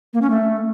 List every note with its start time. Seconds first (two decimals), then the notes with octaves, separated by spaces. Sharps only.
0.14 A#3
0.22 C#4
0.30 A3